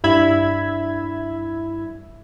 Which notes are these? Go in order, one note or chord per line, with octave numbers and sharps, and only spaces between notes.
G2 E4 E5 B5 E6 G#6